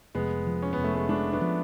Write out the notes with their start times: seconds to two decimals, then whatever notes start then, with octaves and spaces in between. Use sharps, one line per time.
0.15 F1 G#3 B3
0.47 F3
0.62 C#4
0.73 F1 B3
0.84 A3
0.94 G#3 B3
1.09 G#3 B3 D4
1.33 B3 D4
1.41 F3